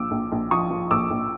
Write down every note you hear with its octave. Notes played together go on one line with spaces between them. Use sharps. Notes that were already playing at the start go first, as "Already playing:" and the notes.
Already playing: A#1 F3 D6 E6
A#1
A#1
F3 C#6 D#6
F3
A#1 D6 E6
A#1